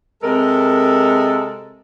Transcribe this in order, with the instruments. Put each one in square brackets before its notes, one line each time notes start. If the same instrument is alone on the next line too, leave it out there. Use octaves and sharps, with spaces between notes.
[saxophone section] C3 G#3 A4 A#4